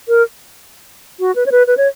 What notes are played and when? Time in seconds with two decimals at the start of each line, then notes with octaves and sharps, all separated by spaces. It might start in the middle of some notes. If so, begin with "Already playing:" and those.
0.08 A#4
1.20 F#4
1.36 B4
1.46 C#5
1.52 B4
1.67 B4
1.77 C#5